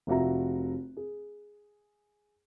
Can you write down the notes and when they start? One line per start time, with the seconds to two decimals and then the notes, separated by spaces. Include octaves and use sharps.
0.07 F1 F4 F#4 E5 A#5
0.97 G#4